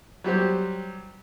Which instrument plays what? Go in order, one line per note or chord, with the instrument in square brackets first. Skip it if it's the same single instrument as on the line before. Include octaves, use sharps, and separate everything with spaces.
[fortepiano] F#3 G3 G4 C5